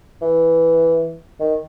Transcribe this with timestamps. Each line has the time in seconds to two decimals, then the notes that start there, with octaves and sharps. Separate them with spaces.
0.22 E3
1.40 D#3